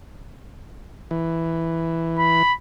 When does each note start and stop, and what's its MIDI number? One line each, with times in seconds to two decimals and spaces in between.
1.11 2.43 52
2.19 2.53 83